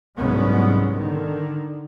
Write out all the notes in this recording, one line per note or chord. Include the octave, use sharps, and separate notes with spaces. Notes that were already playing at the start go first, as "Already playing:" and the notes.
C2 G#2 F#3 G#3 B3 C#4
D3 D#3